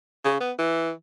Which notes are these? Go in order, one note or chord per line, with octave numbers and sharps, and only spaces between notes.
C#3
B3
E3